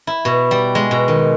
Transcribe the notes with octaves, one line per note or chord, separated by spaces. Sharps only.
E4
B2
G3
G#3
B2
D#3